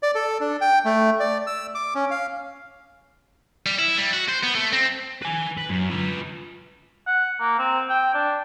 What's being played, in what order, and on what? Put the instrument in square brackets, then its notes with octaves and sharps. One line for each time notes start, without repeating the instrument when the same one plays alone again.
[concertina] D5
A4
D4
G5
A3
D5
E6
D6
C#4
F5
[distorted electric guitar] G3
E4
G3
F#4
C5
B3
A3
C4
B4 G#5
B4
F#2
F4 B4
[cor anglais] F#5
A#3
C4
G5
D4